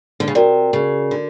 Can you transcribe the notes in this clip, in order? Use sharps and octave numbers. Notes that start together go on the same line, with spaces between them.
D3
C#3
C3 F#4 A#4 D5
C#3
D3